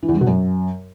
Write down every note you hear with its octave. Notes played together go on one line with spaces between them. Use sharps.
E3
E2
G2
B2
F#2